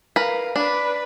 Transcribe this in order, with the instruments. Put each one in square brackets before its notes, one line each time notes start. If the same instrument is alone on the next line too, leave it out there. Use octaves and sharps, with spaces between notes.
[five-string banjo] A#4 B4 [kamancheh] F5
[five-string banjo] D4 [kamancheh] B4 D5